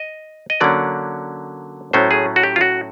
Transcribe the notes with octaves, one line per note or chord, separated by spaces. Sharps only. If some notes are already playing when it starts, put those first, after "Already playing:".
Already playing: D#5
D#5
D3 F#3 A#3 C#4 D5
A2 F#3 A3 C#4 C5
G#4
F#4
G4
F4
F#4